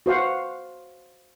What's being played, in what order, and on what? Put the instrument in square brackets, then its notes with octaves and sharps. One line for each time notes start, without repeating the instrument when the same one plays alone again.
[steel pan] F#4 C5 F5 F#5